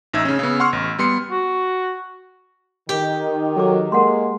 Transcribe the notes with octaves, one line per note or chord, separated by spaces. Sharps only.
A1 D#4 E5 E6 G#6
C#3 C#4
C#3 B3
F#5 C6 C#6 F6
A1
G3 B3 C6 C#7
F#4
D#3 G4
F#3 A4 D6
G#3 A#3 A#4 F#5 C6